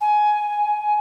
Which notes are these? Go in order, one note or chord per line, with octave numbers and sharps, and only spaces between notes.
G#5